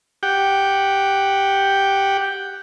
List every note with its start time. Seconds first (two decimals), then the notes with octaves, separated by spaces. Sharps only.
0.23 G4 F#5 G5